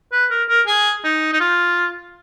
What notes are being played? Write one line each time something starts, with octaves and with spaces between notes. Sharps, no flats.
B4
A#4
A#4
G#4
D#4
D#4
F4